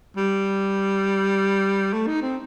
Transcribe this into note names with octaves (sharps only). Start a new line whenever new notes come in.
G3
A3
D#4
C4